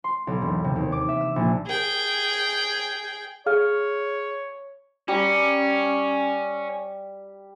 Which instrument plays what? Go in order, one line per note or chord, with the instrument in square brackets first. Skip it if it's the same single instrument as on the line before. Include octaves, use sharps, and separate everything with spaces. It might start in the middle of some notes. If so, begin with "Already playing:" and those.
[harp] C6
B1
E1
C3
D#2
D6
E5
E6
A#1
[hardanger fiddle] G#4 G5
[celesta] G#4 F5 F6 [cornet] C#5
[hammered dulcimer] G3 G4 A#5 [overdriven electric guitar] C#4